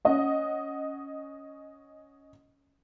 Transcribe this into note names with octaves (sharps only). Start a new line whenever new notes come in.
C#4 D#5 F#5